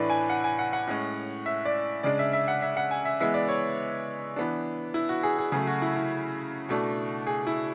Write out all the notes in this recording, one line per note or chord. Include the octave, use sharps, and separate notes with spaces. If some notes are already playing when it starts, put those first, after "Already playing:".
Already playing: A2 E3 A3 D4 B4 D5
G#5
F#5
G#5
F#5
F#5
A2 G#3 C#4
E5
D5
C#3 G#3 D4 D5
E5
E5
F#5
E5
F#5
G#5
E5
E3 G#3 B3 E5
D5
C#5
E3 B3 D4
E4
F#4
G#4
G#4
C#3 F#3 A3 G#4
F#4
E4
E4
B2 A3 D4
G#4
E4